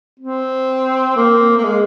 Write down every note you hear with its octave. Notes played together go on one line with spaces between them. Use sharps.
C4
A#3
A#3
G#3